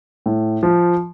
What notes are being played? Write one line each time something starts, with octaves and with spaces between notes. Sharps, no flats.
A2
F3